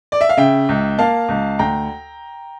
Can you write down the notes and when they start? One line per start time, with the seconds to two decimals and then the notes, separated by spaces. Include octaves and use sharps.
0.12 D5
0.21 E5
0.29 F5
0.37 C#3 E5 G5
0.69 C#2
0.98 A#3 F5 A5
1.29 C#2
1.59 D2 G5 A#5